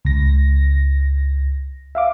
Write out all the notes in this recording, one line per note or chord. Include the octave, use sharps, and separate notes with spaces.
C#2 A#6
E5 F5 D6